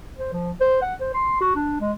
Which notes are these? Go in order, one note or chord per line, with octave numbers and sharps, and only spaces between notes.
C5
F3
C5
F#5
C5
C6
F#4
D4
G#3